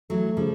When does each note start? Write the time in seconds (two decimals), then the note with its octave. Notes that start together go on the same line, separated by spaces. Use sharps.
0.10 E3 F#3 A3
0.37 C#3 F3 G3